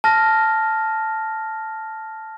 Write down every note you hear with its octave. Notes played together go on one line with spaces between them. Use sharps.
A5 F6 A#6